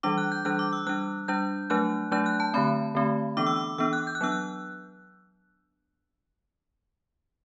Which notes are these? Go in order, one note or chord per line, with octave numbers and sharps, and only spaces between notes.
E3 G3 D4 D6
F#6
G6
E3 G3 D4 F#6
D6
E6
G3 D4 F#6
G3 D4 G6
F#3 A3 D4 F#6
F#3 A3 D4 G6
F#6
A5
D3 A3 C4 B5
D3 A3 C4
E3 B3 D4 D6
E6
D6
E3 B3 D4 E6
F#6
G6
F#6
F#3 B3 D4 E6
F#6